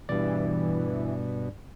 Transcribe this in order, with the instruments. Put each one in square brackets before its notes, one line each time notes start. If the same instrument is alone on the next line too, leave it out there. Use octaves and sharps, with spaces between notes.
[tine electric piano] G2 D5 [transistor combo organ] B2 [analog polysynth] E3